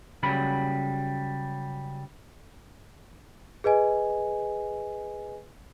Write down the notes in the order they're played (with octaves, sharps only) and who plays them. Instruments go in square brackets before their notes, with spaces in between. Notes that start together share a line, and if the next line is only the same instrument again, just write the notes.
[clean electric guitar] C#3 F#3 G3 B5
[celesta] G#4 B4 D#5 G#5